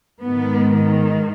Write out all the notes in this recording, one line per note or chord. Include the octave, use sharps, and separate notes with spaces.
G#2 D#3 B3